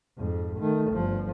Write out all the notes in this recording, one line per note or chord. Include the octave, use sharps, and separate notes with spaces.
F2 G#2
D#3 A3
G1 F3